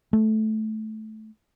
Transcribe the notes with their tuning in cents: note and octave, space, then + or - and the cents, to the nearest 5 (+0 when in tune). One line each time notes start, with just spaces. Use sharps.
A3 -15